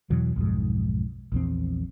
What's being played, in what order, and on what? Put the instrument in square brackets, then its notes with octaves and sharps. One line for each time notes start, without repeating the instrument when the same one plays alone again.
[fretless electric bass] E2 B2 E3 F#3
B1 F2 G#2
A#1 E2 C4